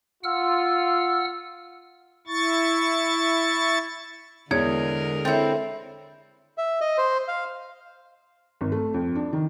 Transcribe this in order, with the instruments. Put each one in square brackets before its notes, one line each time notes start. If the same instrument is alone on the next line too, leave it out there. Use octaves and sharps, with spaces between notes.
[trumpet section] F4 [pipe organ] F#5 E6 F6
[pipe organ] E4 C#6 A6
[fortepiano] E2 [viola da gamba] D3 G#3 A#4 [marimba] G#4 C#5 D5
[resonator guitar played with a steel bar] C4 E4 [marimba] A4 C#5
[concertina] E5
D#5
C5
F5
[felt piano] G#1
A3
F2
D4
D#3